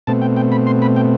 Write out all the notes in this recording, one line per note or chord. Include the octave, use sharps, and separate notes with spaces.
B2 A3 C4 A5
G5
G5
B5
C6
B5
G5